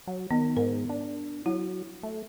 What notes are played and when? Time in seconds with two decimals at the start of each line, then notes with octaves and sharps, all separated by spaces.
0.07 F#3
0.31 D#3 B3
0.57 G#2 A#4
0.89 D4
1.46 F#3 E4
2.03 A3